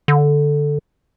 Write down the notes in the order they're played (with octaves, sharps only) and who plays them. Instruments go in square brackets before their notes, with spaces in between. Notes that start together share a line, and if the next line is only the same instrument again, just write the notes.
[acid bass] D3